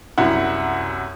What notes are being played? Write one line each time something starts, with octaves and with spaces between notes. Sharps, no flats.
C2 F#2 E4 F#5